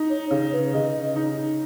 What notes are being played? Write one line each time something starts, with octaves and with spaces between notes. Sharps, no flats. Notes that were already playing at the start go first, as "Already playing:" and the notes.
Already playing: D#4
C#5
C#3 C#5
B4
C#3 D#5
D#4